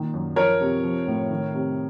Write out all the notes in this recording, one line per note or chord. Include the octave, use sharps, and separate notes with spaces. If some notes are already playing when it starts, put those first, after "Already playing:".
Already playing: A#2 D#3
F#2
F3 A#4 C#5
C3
F3
A2
D#3
C3